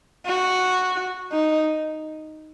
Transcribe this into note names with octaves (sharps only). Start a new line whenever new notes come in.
F#4
D#4